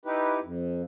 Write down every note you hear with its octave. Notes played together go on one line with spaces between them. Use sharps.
D#4 E4 G4 B4
F2